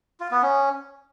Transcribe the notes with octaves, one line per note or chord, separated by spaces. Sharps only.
F4
B3
C#4